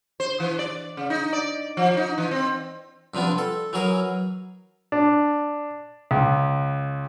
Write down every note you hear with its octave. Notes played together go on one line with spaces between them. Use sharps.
C5
E3
D5
C#3
D#4
D5
F3
D#4
E3
C4
G2 C3 F3 B3 D4
A4
E3 F#3 G#4 A#4
D4
C#2